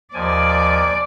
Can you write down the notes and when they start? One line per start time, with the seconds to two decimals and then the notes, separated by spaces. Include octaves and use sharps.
0.14 D#2 F3 D5 G#5